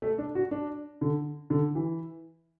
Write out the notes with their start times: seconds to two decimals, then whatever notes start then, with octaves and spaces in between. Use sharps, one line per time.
0.02 A3
0.18 D4
0.35 F#4
0.51 D4
1.01 D3
1.50 D3
1.75 E3